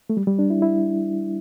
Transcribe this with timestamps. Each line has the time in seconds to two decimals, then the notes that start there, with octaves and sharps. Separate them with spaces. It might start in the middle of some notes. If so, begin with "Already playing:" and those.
0.10 A3
0.17 G3
0.27 G3
0.39 D4
0.50 E4
0.62 E4